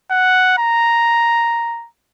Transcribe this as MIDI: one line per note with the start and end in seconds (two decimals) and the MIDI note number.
0.11 0.55 78
0.58 1.88 82